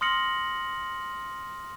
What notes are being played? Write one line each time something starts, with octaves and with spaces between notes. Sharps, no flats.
C6 D#6 F6 A#6 C#7 F#7